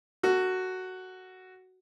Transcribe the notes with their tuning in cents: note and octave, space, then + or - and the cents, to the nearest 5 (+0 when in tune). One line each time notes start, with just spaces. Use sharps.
F#4 +5 A4 +40